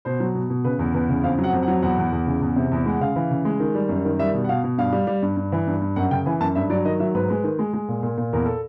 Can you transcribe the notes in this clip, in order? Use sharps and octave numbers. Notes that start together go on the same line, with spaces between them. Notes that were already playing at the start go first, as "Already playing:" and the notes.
B2 C5
F#3
B2
B2
C#3 B4
E2
E2 B4
C#3
F2 F5
F#3
F#5
F2
F#5
F#3
E2 F#5
E2
E2
C#3
E2
C3
E2
G#3 F#5
C#3 F5
E3
C#3
G#3
D#3
G3
F#2
D#3
G3 E5
B2
F#5
B2 F5
B2
G2 F5
G3
G3
G2
G2
E3
G2
G2
F#2 F#5
C#3 G5
E3 G#5
F#2 A5
G2 E5
F#3 D5
D#3 D#5
F#3 E5
G#2 B4
G#3
D#3
G#3
G#3
A#2
A#2
A#2
E2 A#4
A4